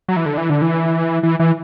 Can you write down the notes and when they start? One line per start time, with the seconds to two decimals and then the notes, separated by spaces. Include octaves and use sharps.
0.08 F#3
0.17 E3
0.26 D3
0.38 E3
0.50 D3
0.62 E3
1.23 E3
1.39 E3